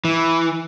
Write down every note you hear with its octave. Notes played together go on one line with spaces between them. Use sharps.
E3